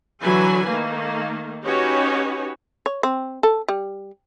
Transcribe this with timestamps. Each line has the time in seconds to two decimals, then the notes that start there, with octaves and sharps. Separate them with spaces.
0.21 D3 E3 F#3 E4 B4 G#5
0.68 D#3 A3 A#3
1.65 C#4 D#4 F#4 G4 B4 C#5
2.86 C#5
3.03 C4
3.43 A4
3.68 G3